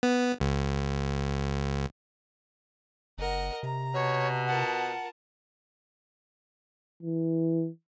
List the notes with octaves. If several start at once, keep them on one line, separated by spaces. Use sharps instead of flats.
B3
C#2
F#1 A#4 D#5 F#5
C3 A#5
B2 C#5
F4 A#4 F#5 A5
E3